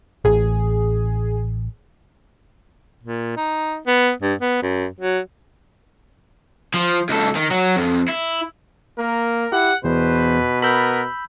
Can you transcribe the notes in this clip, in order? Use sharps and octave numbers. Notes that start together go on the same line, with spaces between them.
A1 G#4
A#2
D#4
B3
G2
B3
F#2
F#3
F3
C#2 A4
D#3
F#3
F2
E4
A#3 A#4
E4 G4 F#5
E2 B2 B4 C5
B3 A#4 B5 E6 G6